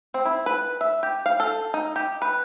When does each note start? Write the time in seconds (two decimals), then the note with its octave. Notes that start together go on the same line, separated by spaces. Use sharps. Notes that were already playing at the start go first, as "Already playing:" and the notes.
0.14 C4
0.26 E4
0.46 B4
0.81 E5
1.03 G4
1.26 F5
1.40 A4
1.74 D#4
1.96 G4
2.22 B4